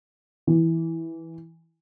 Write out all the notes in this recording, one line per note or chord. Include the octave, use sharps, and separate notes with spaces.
E3